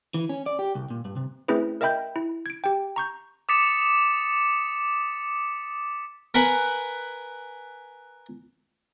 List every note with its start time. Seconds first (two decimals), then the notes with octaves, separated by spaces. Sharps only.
0.14 E3
0.29 C#4
0.46 D5
0.59 G4
0.75 C2
0.90 A#2
1.05 G2
1.17 C3
1.48 A3 C4 C#4 E4 G#4 B4
1.81 A#4 D#5 E5 G5 B5 G6
2.16 E4
2.46 G#6 D7
2.64 G4 G5
2.96 A#5 C#6 G6
3.49 D6 D#6 A6 B6 C#7 E7
6.34 A#4 B4 F#5 G#5 B5